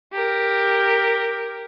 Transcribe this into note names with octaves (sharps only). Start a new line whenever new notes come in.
G4 A#4